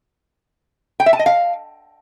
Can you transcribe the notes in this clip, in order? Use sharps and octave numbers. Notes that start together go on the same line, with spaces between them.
G5
E5
A5
D#5
F5